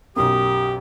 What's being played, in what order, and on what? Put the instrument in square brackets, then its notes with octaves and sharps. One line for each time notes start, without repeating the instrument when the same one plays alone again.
[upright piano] B1 F#2 [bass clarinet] G4 [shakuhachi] D#6